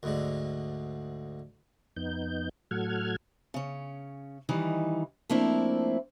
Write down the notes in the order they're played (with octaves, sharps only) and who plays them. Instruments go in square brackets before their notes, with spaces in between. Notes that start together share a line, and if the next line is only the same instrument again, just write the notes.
[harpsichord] D2 G#2 D3
[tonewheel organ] F2 B3 D#4 G6
A2 F#3 A4 F#5 F6 G#6
[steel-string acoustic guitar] C#3 C#4
D#3 E3 G3 D#4
F3 A3 A#3 C4 D4 E4